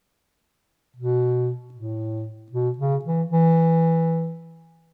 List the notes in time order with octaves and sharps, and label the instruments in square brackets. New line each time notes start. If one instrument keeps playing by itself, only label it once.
[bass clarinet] B2
A2
B2
C#3
E3
E3